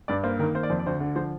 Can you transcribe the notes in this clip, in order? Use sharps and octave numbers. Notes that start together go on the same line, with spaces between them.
G2 D5
A#3 C5
D#3 A#4
A#3 C5
D5
F2 C5
D5
D2 C5
D3
F3 C5